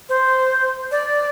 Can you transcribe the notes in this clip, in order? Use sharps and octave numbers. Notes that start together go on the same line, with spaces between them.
C5
D5